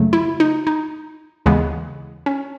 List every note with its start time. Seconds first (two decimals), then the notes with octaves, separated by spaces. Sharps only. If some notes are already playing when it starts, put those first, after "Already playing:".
Already playing: F#2 C#3 F#3 A3
0.13 E4
0.40 D#4
0.67 D#4
1.46 D#2 C#3 E3 G#3 B3
2.26 C#4